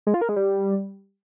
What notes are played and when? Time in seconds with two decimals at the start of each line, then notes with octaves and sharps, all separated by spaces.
0.07 G#3
0.14 F4
0.21 A#4
0.29 G#3
0.36 G3